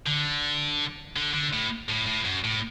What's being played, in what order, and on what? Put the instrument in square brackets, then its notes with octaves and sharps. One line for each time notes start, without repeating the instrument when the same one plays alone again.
[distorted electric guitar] D3
D3
D3
A2
A2
A2
F#2
A2